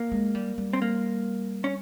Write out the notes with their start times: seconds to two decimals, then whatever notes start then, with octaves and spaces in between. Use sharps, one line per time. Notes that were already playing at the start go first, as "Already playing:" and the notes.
Already playing: A#3
0.12 G#3
0.35 G3
0.58 G3
0.73 C4
0.82 A#3
1.64 C#4